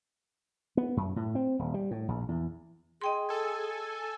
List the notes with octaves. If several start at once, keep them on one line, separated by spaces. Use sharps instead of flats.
B3
F#2
A2
C4
D#1
G3
A2
A#1
E2
G#4 D#5 G5 C6
A4 G#5